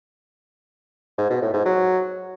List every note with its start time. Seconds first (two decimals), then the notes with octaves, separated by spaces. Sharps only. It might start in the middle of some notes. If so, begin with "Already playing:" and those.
1.18 G#2
1.30 B2
1.42 A2
1.54 G#2
1.65 F#3